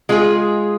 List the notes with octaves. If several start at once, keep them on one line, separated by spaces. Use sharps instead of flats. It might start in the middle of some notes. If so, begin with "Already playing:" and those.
G#3 F4 G#4